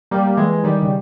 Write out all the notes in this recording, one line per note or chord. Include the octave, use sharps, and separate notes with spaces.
G3 A#3
A#3
E3 G#3
G#3
D#3 G3
C#3